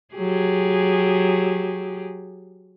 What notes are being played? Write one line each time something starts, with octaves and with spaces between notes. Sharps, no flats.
F#3 G4 G#4